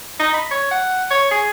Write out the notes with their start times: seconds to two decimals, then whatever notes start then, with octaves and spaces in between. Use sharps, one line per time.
0.20 D#4
0.34 B5
0.51 C#5
0.71 F#5
1.11 C#5
1.31 G#4